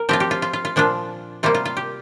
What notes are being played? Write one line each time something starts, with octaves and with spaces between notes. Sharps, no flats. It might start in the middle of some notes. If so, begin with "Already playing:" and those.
Already playing: A#4
F3 C4 F4 G4
G4
F4
F4
F4
F4
A#2 F3 D4 F4
C3 G3 A#3 F4
F4
F4
G4